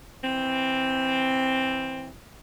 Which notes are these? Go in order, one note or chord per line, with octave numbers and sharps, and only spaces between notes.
E3 C4